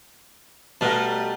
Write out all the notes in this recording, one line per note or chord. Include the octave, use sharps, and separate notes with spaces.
B2 G3 A3 A#4 F#5 A5